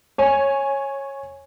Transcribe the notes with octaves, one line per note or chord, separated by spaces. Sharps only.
C#5 G#5